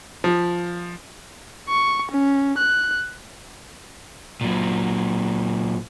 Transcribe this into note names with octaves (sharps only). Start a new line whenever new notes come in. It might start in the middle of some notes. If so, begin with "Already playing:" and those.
F3
C#6
C#4
F#6
A#2 F#3